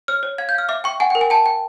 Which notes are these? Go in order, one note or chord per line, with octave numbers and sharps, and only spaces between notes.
C#5 F6
C#5
F5 G#6
G6
F5 F6
E5 D6
G5 C#6
F#5 G#5
G5
A#4
G#5
G5 A5
G5